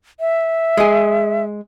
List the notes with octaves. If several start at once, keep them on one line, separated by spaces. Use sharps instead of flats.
E5
G#3 G#4